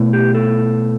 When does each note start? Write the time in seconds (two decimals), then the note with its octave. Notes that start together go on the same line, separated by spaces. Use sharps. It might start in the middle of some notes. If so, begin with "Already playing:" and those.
Already playing: B2 A3 E4
0.13 G4
0.35 A4